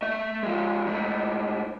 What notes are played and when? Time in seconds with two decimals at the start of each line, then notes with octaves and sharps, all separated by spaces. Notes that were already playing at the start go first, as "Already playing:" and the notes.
0.02 A3 E5
0.43 F3 G#3
0.86 G#2 A3